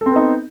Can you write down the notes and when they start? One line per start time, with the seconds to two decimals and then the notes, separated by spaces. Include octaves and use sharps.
0.01 A4
0.06 C4
0.11 B3
0.16 D#4